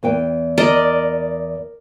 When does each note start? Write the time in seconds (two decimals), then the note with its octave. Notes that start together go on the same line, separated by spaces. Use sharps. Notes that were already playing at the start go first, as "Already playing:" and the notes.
0.03 E2 B4 G5
0.58 A#4 D5 D#5